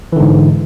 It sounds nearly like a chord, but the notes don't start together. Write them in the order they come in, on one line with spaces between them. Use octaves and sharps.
E3 D3 G#2